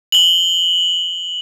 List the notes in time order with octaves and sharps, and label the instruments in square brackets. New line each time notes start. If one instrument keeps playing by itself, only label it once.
[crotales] F#7 G7